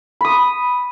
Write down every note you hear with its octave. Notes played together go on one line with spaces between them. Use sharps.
B5 D#6